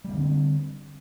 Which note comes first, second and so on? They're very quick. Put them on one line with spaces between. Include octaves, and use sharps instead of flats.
G3 A#3 D3 C4